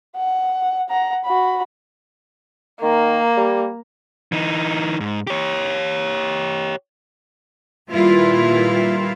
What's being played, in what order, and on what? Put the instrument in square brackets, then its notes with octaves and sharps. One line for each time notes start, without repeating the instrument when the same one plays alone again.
[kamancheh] F#5
F#5 A#5
F#4 B5
[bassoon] D#3 [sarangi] A#3
[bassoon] G3
[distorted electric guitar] E3 D#4
G#2
G4 C#5
[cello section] A#2 D#3 G3 E4 F4 B4